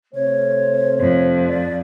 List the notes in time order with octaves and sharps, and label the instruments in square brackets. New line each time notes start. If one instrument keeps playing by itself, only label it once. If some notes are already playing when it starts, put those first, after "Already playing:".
[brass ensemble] C3 A3 C5 [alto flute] C#5
[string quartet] F2
[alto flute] D5